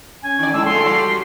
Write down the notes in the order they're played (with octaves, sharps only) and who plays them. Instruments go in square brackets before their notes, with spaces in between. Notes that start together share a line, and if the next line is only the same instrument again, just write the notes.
[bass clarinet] C#4 [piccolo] G#5
[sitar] D#3 D5
[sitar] A2 D4 [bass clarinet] G#3 [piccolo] E6
[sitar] A#2 C#3 A3 [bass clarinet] A4 [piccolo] C6
[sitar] G3 C#4 F#4